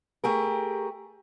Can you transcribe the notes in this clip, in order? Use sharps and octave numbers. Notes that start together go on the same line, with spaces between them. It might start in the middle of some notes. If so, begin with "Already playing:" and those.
A3 G4 G#4 A#4